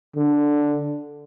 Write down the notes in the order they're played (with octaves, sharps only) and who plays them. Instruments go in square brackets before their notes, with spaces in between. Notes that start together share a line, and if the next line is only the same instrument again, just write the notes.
[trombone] D3